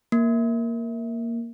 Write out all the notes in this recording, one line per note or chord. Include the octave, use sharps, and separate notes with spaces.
A#3